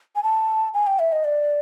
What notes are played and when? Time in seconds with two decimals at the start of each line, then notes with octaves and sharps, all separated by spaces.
0.16 G#5
0.23 A5
0.74 G#5
0.87 G5
0.99 E5
1.12 D#5
1.24 D5